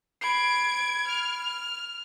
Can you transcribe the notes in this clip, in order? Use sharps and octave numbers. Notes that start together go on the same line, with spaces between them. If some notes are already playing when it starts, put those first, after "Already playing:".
B5 G#6 C7 D7
F6